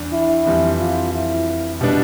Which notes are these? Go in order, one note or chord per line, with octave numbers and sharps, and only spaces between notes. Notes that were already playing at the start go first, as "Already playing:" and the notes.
Already playing: E2 D4
E4
F2 E3 G3
F4
E4
B2 G3 B3 D4